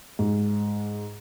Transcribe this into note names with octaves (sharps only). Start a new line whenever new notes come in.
G#2